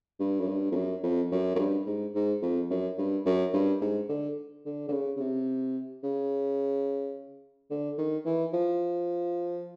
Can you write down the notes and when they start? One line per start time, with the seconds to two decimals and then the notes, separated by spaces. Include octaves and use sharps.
0.19 G2
0.40 F#2
0.48 G2
0.71 F2
0.76 F#2
1.03 F2
1.32 F#2
1.55 F#2
1.58 G2
1.86 G#2
2.14 G#2
2.42 F2
2.70 F#2
2.98 G2
3.25 F#2
3.54 G2
3.81 G#2
4.09 D3
4.65 D3
4.88 D3
4.92 C#3
5.17 C#3
5.20 C3
6.04 C#3
7.71 D3
7.98 D#3
8.26 E3
8.53 F3